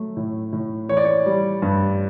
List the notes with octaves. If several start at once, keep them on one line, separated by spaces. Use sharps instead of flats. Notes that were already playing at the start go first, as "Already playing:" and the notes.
Already playing: F#3 A3
A2
A2
E3 C#5
D5
C#5
G3
G2